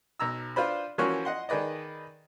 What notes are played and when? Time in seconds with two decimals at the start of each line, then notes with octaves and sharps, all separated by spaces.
0.20 B1 A#5 E6
0.56 D4 F4 B4 C5 B5
0.98 E3 F3 A#3 C#4 F#4 C#5
1.25 D#5 F#5 C6
1.49 D#3 G#4 B4 D5 D#5